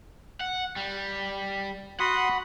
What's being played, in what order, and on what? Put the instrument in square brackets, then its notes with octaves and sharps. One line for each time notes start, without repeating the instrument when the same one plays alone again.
[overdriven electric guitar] F#5
G3
[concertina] F#4 C6 D#6 [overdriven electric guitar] F#5 [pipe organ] B5